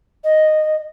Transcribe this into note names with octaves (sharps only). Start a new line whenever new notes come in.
D#5